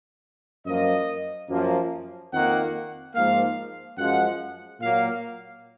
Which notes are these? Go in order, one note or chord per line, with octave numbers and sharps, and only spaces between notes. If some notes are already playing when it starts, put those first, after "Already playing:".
F#2 F3 A#3 D#5
F#2 F3 A#3
F2 D#3 A#3 F#5
G#2 F3 A#3 F5
F#2 F3 G#3 F#5
A#2 F#3 A#3 F5